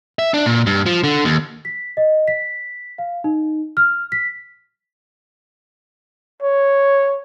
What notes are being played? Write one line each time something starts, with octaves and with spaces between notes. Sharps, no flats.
E5
D4
A#2
G2
F3
D3
D#2
B6
D#5
B6
F5
D#4
F6
B6
C#5